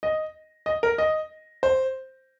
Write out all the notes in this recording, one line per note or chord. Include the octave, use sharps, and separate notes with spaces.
D#5
D#5
A#4
D#5
C5